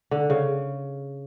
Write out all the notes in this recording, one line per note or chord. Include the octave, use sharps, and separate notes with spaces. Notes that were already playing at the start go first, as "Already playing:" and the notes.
D3
C#3